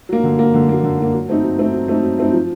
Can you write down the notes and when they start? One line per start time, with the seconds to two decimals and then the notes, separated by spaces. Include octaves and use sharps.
0.09 F#3 A#3
0.24 D3
0.39 F#3 A#3
0.54 D3
0.69 F#3 A#3
0.84 D3
0.99 F#3 A#3
1.14 F#3
1.28 A3 C4 D#4
1.44 F#3
1.58 A3 C4 D#4
1.73 F#3
1.88 A3 C4 D#4
2.03 F#3
2.18 A3 C4 D#4
2.33 F3